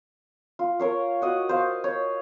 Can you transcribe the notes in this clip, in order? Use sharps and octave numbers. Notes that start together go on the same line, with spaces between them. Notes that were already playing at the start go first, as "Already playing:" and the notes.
F4
A#4 C#5 F5
F#4 D#5 F#5
C5 F5
C#5